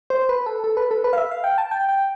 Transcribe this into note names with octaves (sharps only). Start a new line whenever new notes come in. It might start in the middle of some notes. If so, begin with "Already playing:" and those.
C5
B4
A4
A4
B4
A4
B4
F5
E5
F5
G5
A5
G5
G5